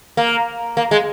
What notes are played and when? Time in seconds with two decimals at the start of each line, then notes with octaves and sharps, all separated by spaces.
0.17 A#3
0.77 A#3
0.91 G#3